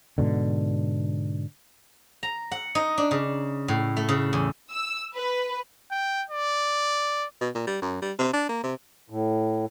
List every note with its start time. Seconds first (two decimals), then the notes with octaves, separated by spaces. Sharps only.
0.18 G#2 B2 D3
2.23 A#5
2.51 F#5
2.75 D#4
2.98 D4
3.11 C#3
3.68 A2
3.97 A3
4.09 C#3
4.33 E2
4.70 E6
5.15 B4
5.91 G5
6.30 D5
7.41 B2
7.55 A#2
7.67 G3
7.82 F#2
8.02 G3
8.19 C3
8.33 D4
8.49 A#3
8.64 C3
9.10 A2